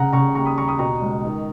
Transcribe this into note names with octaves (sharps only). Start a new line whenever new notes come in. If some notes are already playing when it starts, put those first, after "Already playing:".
Already playing: C#3 F#5 A#5
C#3 A#5 C#6
D#2 A#5 C#6
B5 D#6
D#2 A#5 C#6
B5 D#6
B2 A#5 C#6
C#2
D#3